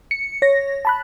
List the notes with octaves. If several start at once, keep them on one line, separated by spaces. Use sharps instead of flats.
C#7
C#5 A#6
A5 B5 F#6